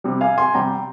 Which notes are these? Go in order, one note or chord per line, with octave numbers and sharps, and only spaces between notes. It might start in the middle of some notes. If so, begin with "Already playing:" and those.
C3 G3
F5 G#5
G#5 C6
C3 G3 G5 A#5